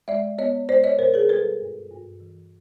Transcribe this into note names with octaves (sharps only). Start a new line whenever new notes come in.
G#3 D5 E5
B3 C#5 D#5
G#3 C5 D5
C#5 D#5
B2 A#4 C5
G#4 A#4
G3 A4 B4
G2
G2
E3